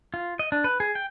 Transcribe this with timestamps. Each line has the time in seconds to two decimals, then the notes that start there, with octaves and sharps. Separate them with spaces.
0.14 F4
0.39 D#5
0.52 D4
0.64 B4
0.80 G#4
0.95 G5